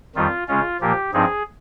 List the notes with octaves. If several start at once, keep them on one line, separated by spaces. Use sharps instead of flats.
F2 D#3 G3 F4
C#3 G#3 C#4 F4
A#2 F3 A#3 G4
G2 F3 C4 D#4 G#4